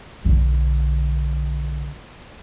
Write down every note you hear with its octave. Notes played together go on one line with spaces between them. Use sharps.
B1 D3